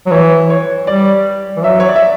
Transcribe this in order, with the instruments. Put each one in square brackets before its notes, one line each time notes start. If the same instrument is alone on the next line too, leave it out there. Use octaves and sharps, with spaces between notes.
[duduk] F#3
[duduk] E3 [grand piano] C#5
[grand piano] C#5
[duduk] G3 [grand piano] D5
[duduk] E3
[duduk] F#3 [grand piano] E5
[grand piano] C#5
D5
E5